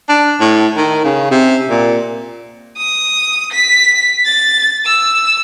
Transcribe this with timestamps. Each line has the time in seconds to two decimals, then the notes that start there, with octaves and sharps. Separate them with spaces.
0.09 D4
0.40 A2
0.77 D#3
1.04 C#3
1.31 C3
1.70 A#2
2.77 D#6
3.52 B6
4.26 A6
4.86 E6